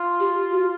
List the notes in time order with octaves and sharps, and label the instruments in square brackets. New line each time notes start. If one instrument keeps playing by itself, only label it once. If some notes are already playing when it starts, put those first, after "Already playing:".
Already playing: [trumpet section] F4
[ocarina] G4
F#4